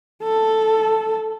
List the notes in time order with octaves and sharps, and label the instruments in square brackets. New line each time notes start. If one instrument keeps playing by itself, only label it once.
[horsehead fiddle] A4